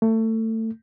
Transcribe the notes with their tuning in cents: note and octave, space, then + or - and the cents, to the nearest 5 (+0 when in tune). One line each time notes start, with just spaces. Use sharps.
A3 +25